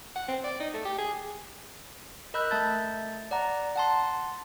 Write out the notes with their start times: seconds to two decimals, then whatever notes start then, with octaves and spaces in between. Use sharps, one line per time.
0.16 F#5
0.28 C4
0.44 D5
0.60 D#4
0.74 A3
0.85 G4
0.98 G#4
2.34 A#4 D#5 B5 E6 F#6 G6
2.51 A3 E5 A5 G6 A6
3.31 D5 F#5 A#5
3.76 F#5 A5 C6